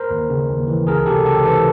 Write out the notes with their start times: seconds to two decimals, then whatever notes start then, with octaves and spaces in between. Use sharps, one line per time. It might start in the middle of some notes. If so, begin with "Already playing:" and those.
Already playing: A#4 C5
0.11 D#2
0.30 C#3
0.49 D#2
0.68 E3
0.87 C#2 G#4 A#4
1.06 C3 G4 A4
1.25 C#2 G4 A4
1.40 C5
1.45 E3 A4 B4